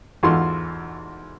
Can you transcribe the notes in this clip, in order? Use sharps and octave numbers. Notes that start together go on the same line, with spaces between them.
E2 G#2 F4 F#4 A4 C6